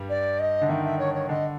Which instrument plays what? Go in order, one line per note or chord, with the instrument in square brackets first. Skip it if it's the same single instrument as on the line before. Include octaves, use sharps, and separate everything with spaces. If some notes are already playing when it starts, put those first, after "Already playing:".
Already playing: [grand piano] G2 G3
[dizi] D5
D#5
[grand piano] D3
[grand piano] D#3 [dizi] E5
[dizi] E5
C#5
C#5
[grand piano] D3 [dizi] D#5